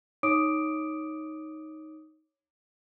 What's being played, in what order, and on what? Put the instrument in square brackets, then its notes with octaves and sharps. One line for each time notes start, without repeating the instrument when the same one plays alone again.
[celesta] D#4 C#5 D6 D#6 D7